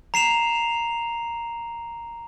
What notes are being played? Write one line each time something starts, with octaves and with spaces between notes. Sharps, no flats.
A#5 C7 E7 F7